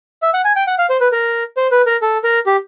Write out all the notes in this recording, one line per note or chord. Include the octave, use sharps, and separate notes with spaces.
E5
F#5
G#5
G5
F#5
F5
C5
B4
A#4
C5
B4
A#4
A4
A#4
G4